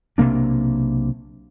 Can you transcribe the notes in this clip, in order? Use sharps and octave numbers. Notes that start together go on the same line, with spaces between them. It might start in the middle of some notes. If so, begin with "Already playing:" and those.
B1 C3 A#3 D4